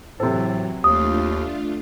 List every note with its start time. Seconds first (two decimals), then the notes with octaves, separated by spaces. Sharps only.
0.20 A2 C3 E3 F#3 A4 C5
0.84 D#2 A3 D4 F4 D#6